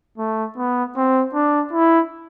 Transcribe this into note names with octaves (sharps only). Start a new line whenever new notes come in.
A3
B3
C4
D4
E4